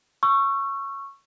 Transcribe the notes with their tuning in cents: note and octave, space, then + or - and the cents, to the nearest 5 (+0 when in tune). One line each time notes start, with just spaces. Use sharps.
C#6 -5 E6 +35